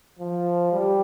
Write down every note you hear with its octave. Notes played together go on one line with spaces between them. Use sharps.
F3
G3